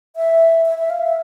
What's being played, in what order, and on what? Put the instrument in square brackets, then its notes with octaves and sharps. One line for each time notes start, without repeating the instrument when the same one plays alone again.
[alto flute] E5
E5
E5
F5
E5